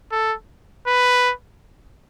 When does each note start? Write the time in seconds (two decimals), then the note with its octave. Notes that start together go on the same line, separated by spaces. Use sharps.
0.12 A4
0.87 B4